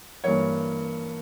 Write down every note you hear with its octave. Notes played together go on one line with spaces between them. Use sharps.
G2 E3 A#3 C#5